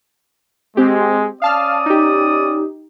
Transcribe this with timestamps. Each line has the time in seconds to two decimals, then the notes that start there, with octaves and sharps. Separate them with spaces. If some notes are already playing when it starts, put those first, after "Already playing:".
0.77 G#3 C4 G4
1.42 C#4 D5 F5 A5 D#6 F6
1.86 D#4 G4